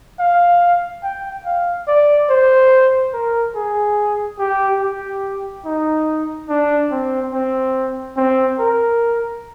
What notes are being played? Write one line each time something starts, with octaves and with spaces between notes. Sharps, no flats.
F5
G5
F5
D5
C5
A#4
G#4
G4
G4
D#4
D4
C4
C4
C4
A#4